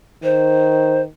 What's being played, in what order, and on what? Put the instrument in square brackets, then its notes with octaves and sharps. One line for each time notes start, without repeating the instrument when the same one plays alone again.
[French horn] D#3 [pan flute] C5